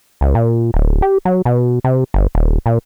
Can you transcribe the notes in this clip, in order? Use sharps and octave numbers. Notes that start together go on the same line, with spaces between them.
C#2
A#2
D1
G4
F#3
B2
C3
G1
D#1
A#2